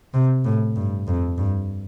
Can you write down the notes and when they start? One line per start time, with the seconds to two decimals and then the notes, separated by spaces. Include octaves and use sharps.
0.14 C3
0.45 A2
0.76 G2
1.07 F2
1.38 G2